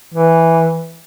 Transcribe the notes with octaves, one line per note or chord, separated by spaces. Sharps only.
E3